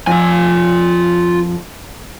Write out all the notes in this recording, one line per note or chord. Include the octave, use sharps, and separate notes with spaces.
F2 F3 F4 G#5